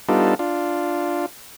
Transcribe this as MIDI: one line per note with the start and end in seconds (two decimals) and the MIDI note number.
0.09 0.35 55
0.09 0.35 59
0.09 0.35 62
0.09 0.35 63
0.09 0.35 65
0.09 0.35 69
0.39 1.26 62
0.39 1.26 65